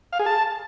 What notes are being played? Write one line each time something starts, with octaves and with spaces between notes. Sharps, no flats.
F5
G#4
A5